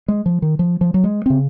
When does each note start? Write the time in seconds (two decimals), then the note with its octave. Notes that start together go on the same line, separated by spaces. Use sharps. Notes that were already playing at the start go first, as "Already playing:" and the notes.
0.08 G#3
0.26 F3
0.42 D#3
0.59 F3
0.81 F3
0.94 F#3
1.04 G#3
1.26 C#3 C4